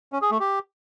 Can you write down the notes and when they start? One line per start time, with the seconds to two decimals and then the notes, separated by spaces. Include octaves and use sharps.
0.13 C#4
0.22 G#4
0.31 A3
0.40 G4